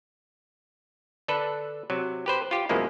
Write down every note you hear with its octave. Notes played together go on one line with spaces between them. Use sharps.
D3 D4 A4 B4
C3 F#3
G4 B4 C5
F4 G4
F#2 B2 F3 G#3 A#3 E4